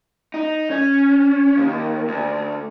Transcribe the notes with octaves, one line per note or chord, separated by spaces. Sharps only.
D#4
C#4
D#2
D2